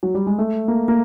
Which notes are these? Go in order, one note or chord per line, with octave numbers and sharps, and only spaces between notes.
F#3
G3
G#3
A3
A#3
A#3